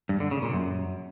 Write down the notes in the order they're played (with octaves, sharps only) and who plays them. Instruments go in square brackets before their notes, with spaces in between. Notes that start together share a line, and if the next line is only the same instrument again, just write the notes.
[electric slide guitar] G2
D3
C#3
A#2
F#2